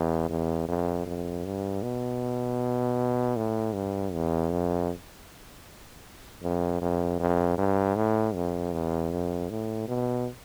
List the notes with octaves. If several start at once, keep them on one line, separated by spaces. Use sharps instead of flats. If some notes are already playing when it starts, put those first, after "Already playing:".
Already playing: E2
E2
F2
F2
G2
B2
A2
G2
E2
F2
F2
F2
F2
G2
A2
F2
E2
F2
A2
B2